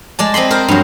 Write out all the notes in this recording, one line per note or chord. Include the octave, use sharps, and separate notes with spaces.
G#3 D5 A5
C4 D#5 B5 C6
A#4 C5
G2 F#3